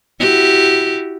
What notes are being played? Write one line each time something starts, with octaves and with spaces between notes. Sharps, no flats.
E4 F#4 G4